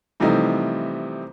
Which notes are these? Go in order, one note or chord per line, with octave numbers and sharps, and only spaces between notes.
C3 E3 F3 G3 A3 D#4